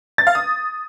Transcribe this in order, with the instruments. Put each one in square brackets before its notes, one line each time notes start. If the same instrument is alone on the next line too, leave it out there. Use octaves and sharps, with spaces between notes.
[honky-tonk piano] A6
F5
D#6